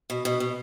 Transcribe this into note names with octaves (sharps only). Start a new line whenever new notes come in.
B2
B2
B2